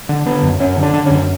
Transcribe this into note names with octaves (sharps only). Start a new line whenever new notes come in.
D3
D3 B3
F#2
F#2 C#4
D3
D4
D3
C#4
F#2